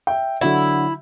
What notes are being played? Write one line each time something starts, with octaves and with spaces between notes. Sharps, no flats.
E5 G5
D3 F#3 E4 F#4